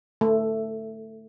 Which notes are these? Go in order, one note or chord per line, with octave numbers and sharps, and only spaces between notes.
A3